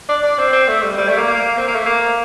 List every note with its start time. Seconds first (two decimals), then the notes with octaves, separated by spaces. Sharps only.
0.09 D4
0.23 D4
0.39 C4
0.52 C4
0.68 A3
0.83 G3
0.97 G3
1.08 A3
1.17 A#3
1.27 A#3
1.57 C4
1.67 A#3
1.75 A3
1.85 A#3